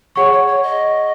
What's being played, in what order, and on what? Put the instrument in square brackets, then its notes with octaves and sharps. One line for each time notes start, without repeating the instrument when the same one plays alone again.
[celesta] G#4 F#5 C#6 [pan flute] C#5
[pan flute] C#5
C#5
D#5